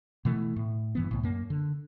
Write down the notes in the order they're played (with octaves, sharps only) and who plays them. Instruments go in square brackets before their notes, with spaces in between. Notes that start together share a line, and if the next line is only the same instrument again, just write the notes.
[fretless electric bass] B2 E3 A3
A2
G2 E3 B3
C2 A2
F#2 A#3
D3